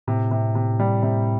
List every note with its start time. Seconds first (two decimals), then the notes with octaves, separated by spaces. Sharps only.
0.07 A2 C3
0.31 C3
0.55 C3
0.80 G3
1.02 C3